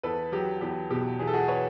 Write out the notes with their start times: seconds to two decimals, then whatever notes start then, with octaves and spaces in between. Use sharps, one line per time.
0.03 E2 A4 B4
0.32 F#3 G4
0.61 E2 G4
0.90 B2 G4
1.19 E2 G#4
1.27 A4
1.33 F#4 G#4
1.48 B4 C#5